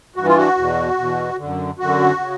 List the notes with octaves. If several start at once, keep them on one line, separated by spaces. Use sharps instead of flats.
G2 E3 F#4
F4
F#4
E2 B2
E2 B2
F#2 D3
F#2 D3 F#4
C#3